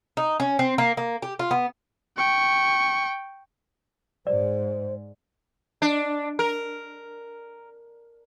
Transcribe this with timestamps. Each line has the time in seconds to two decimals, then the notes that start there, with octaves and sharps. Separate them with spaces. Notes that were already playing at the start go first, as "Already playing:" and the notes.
0.17 D#4
0.40 C#4
0.59 C4
0.78 A#3
0.97 A#3
1.22 G4
1.39 F4
1.51 B3
2.17 G5 C#6
4.27 G#2 G#3 C5 D5
5.82 D4
6.39 A#4